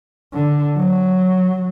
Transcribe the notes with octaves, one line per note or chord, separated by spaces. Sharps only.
D3
F#3